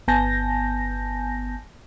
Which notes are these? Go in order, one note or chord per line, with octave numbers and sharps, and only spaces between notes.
G1 B3 G#5 A5 G6 A#6